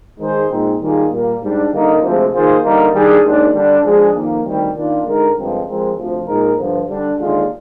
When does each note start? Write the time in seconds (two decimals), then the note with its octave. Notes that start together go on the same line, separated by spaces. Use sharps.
0.19 D#3 G#3 D#4 G#4 C5
0.50 A#2 G#3 C4 D#4
0.80 D#3 G3 A#3 F4 G#4
1.11 A#2 G3 A#3
1.42 G#2 G3 D4
1.72 D3 G3 A#3 D#4 A#4
2.02 D2 C3 F3 G#3
2.33 D#3 A#3 F4 G#4 C5
2.63 D3 G3 A#3 D#4 A#4
2.93 D#3 G3 D4 G#4
3.24 D#2 D#3 G#3 D4
3.53 D3 G3 D4
3.84 F3 G#3 D4 G#4
4.14 F2 D#3 A#3
4.44 D2 C3 D#3 G3
4.75 D#3 A#3 D4 F4
5.05 D3 G#3 D#4 A#4
5.37 G2 D3 F3 G#3 C4
5.66 F3 G#3 C4 G4 A#4
5.97 D2 C3 F3
6.27 A#2 G#3 D#4 A#4
6.58 G2 D3 F3
6.88 D3 G3 D4
7.19 D#2 D3 G#3 D4 F4